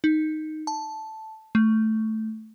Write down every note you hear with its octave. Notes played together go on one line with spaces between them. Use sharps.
D#4
A5
A3